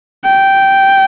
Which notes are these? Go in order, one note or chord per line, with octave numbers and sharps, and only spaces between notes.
G5